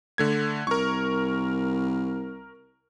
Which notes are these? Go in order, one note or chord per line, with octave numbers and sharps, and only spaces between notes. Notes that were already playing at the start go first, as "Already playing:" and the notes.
D3 A3 G#6
C2 A#4 C#6